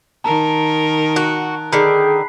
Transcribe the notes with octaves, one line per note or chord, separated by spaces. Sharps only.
D#3 A#4 A5 A#5
F#4 F#6
D3 D#3 G#4 B5 B6 C7